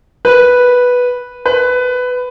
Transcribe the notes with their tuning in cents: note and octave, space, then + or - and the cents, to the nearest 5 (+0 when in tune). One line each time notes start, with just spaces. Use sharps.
B4 -5
B4 +15